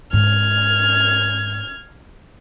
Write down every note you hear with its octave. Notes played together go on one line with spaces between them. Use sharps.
G#2 F6 G#6